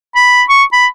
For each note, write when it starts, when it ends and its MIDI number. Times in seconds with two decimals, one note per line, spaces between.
0.16 0.43 83
0.50 0.64 85
0.73 0.86 83